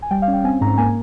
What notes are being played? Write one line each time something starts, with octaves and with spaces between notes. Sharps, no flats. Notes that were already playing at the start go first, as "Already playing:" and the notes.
G#5
G3 G5
F5
C#4
G5
C4 G#5
G#2 A#5
A#3 G#5